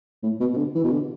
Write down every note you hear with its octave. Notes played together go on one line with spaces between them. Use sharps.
A2
B2
B2
D3
E3
B2
D3